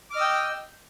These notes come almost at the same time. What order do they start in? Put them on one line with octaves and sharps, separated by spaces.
D6 F6 D#5 E6 G5